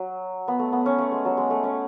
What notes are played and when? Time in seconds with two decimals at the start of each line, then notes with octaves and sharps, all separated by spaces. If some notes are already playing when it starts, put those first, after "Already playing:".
Already playing: F#3
0.48 B3
0.59 A3
0.72 B3
0.86 C#4
0.98 A3
1.12 G#3
1.25 F#3
1.37 G#3
1.50 A3
1.64 C#4